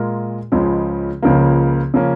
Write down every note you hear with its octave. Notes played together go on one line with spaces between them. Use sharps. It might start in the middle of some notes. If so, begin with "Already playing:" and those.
Already playing: A#2 G#3 F4 A#4
C#2 C#3 F3 G#3
C#2 C#3 F3 A#3
C#3 F3 A#3 C#4